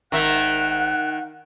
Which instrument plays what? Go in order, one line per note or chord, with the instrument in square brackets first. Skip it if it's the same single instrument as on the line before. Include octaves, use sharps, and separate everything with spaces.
[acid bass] G#1 [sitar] D#3 E5 [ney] F#5 [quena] F#6